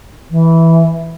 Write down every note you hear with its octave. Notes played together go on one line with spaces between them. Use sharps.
E3